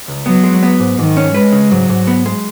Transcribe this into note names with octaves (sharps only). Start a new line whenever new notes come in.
C#2
F#3 B3
G#3
B3
G#2
G#2 D#3
C#4
G#3 B4
C#3
G#2 F#3
G#2
B3
G#3